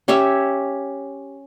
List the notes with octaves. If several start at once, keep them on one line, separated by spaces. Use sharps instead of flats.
C#4 G4 C#5 E5